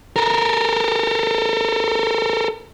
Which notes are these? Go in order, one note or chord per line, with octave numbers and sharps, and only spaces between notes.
A4 A#4